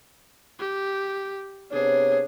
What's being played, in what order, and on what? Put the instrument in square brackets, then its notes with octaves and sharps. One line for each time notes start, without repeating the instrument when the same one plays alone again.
[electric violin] G4
[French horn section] C3 B3 C#5 [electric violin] D4 G#4